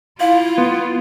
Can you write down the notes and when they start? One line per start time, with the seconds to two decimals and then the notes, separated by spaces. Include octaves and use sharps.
0.20 E4 F4 F5
0.58 B3